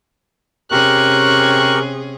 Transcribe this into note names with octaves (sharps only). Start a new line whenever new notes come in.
C3 C#4 G4 G#4 A#4 C#6 F#6